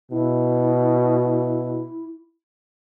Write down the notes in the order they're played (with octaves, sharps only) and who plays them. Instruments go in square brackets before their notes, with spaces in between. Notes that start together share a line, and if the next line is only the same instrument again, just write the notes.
[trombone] B2 [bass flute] E4